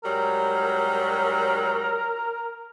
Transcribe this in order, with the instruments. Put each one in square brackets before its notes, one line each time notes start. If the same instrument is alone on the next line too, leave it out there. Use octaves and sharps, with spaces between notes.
[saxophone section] G#2 F#3 G3 [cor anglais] A#4